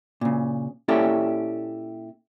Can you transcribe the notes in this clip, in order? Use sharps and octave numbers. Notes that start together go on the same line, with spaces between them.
A#2 C#3
A#2 C#4 E4 G4 A4 D5